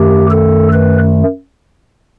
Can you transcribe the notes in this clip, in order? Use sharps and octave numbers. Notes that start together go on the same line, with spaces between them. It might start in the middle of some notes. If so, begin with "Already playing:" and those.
Already playing: F#2 D#3 A3 G4
A4
B4